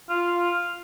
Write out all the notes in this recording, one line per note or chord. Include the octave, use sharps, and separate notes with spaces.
F4